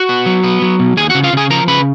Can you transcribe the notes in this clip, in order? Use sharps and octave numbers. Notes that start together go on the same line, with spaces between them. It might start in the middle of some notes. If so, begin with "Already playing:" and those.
Already playing: F#4 F#5
B3
F#3
B3
F#3
B2
D#2 G#4 G#5
C#3 F#4 F#5
F4 F5
C#3 G#4 G#5
F3 A#4 A#5
C#3 B4 B5